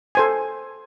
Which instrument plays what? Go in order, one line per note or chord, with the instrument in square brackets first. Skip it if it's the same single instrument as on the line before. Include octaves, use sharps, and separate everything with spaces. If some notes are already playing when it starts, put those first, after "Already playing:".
[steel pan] A4 C5 G#5